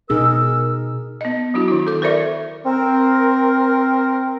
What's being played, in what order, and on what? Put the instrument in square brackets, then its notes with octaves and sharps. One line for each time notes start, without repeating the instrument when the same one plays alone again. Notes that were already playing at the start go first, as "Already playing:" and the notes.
[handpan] B2 D#4 G#4 [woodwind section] A#4 E6
[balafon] B3 D#5
F#3 D4 E4 F#4
D#3 E4
A4 D6
A4 A#4 C5 D5 E5 C#6
[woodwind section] C4 A#4